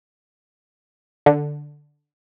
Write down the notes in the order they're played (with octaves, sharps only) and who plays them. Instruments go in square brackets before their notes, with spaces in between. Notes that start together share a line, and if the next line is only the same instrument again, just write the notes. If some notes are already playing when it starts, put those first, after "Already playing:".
[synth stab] D3